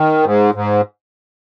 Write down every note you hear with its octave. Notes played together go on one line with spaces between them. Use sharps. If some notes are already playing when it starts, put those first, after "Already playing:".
Already playing: D#3
G#2
G#2